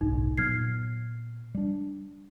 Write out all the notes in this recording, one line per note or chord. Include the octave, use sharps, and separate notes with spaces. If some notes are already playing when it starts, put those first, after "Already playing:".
F#1 B1 G#2 D#4
A#2 F#3 B3 F6 G#6 C7
G3 D4